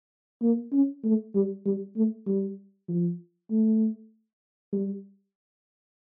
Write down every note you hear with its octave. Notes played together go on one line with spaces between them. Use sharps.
A#3
C#4
A3
G3
G3
A3
G3
F3
A3
G3